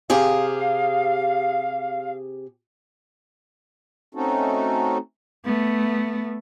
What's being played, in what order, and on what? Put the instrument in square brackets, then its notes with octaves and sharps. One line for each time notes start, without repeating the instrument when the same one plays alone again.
[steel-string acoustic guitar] C3 G4 G#4 [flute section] F5
[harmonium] A3 C4 C#4 D#4 F#4 A4
[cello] A3 B3